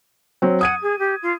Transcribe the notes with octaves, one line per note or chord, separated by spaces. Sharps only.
F#3 C4
F#5 D#6 G#6 D#7
G#4
G4
F4